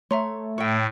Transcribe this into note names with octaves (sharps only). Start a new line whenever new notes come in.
A3 C#5 E5 A#5 C6
A2 C#5 G5